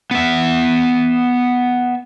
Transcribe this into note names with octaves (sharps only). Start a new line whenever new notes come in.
B3 E5